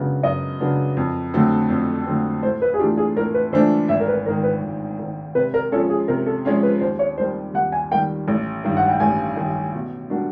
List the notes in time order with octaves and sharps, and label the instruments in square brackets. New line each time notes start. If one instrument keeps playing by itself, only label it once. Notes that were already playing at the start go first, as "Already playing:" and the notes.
Already playing: [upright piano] F#2 C#3 F#3 B3 D4
[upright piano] F#2 [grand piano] D#5
[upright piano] C#3 F#3 B3 D4
F2
D3 F#3 A3 C4
F2
D3 F#3 A3 C4
[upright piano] A2 [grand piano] C5
[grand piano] B4
G#4
[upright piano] E3 A3 D4 F4 [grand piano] G4
[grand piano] G#4
[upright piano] A2 [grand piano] A#4
[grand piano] B4
[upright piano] E3 A3 D4 F4 [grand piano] C5
[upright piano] G#1 [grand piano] E5
[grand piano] A#4
B4
[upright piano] G#2 [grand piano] A#4
[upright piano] D#3
[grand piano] B4
[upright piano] G#1
G#2 D#3
[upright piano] C3 [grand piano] B4
[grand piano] A#4
[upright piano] F3 G#3 C#4 F4 [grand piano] A4
[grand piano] G#4
[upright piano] C3 [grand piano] A#4
[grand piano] A4
[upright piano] F3 G#3 C#4 F4
[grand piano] B4
[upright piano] D#2 [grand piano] C5
[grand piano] C#5
[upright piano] D#3 G3 A#3 [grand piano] C5
[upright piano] D#2 [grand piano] F#5
[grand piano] G#5
[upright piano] D#3 G3 A#3 [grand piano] G5
[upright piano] A1
G2 D#3
[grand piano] F#5
G5
[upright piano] A1 [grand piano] G#5
[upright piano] G2 D#3
B2
G3 A#3 D4 F#4